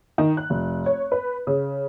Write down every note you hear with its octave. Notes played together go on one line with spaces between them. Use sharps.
D#3
F#6
F1
C#5
B4
C#3